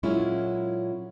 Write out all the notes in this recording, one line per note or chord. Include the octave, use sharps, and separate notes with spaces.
A#2 F#3 G#3 C#4 E4 F4